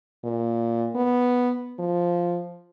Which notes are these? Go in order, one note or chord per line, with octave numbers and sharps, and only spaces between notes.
A#2
B3
F3